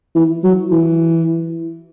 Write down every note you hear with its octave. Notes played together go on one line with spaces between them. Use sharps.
E3
F#3
E3